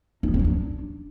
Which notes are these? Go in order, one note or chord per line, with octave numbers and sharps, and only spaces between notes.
D#4
B3
C#4
F#3
D4